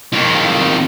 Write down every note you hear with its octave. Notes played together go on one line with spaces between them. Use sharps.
F2 D#3